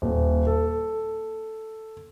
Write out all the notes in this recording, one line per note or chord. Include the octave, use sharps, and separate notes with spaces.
D#1
A4